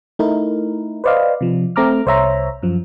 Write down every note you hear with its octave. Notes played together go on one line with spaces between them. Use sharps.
A3 D#4 E4 A#4
B4 C5 D5 D#5 F5
C3 F3
A3 C4 A#5 D6 F6
C2 C5 C#5 E5 A#5
F#2 F3